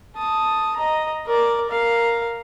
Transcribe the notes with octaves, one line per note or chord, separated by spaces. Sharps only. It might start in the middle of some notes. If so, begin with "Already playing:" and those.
A5 D#6
D#5 A#5
A#4 D5
A#4 F5